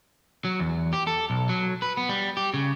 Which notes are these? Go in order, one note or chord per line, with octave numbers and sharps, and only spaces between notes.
F#3
E2
G4
A4
B1
F#3
B4
B3
G3
G4
C#3